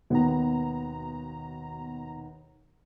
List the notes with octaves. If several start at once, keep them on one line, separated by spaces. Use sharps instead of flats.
D#2 B2 D#3 B3 A#5